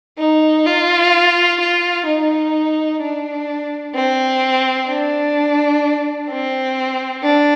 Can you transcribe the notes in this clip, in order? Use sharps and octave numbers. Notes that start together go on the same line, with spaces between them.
D#4
F4
F4
D#4
D4
C4
D4
C4
D4